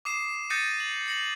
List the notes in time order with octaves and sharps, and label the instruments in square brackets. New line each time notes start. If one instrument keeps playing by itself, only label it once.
[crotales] D6 D#6 C7 E7
D#6 G6 A6 A#6 C#7 D#7
F#7
A#6 C#7 F#7